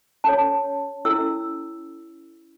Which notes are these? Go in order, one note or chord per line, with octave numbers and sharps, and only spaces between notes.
C#4 A4 C#5 A5
C#4 E4 A4 E6